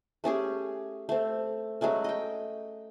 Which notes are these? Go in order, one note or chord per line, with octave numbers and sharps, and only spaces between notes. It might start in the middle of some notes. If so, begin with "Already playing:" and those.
A3 C#4 G4 G#4
A3 C4
F#3 G#3 A3 C#4
D#5 G5